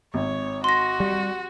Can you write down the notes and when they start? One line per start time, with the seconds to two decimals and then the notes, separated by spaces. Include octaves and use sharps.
0.14 G#1 C#5
0.64 F#4 C6 A#6
1.00 G3